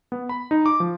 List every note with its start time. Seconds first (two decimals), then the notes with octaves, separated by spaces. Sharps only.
0.12 B3
0.29 B5
0.51 D#4
0.66 D6
0.80 F3